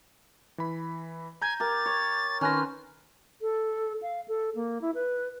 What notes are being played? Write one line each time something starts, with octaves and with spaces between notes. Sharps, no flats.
E3 B5
G#5 A#5 G6 G#6
G4 A#4 A6
C#5
D#3 C#4 B4 C5 F6 F#6 A#6
A4
F5
A4
A#3
E4
B4